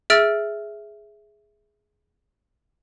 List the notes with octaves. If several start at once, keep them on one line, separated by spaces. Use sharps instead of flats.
G#4 E5 E6 F6 A6 D7